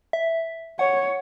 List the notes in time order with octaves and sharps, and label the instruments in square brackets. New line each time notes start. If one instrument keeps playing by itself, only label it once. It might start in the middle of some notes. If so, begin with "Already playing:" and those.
[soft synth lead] E5
[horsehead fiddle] C#5 [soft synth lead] F#5